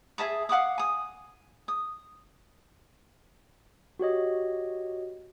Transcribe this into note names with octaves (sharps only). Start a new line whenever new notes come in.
G#4 E5 A5 D#6
F5 F#5 D6 D#6
G#5 D#6
D#6
F#4 G4 C#5 D#5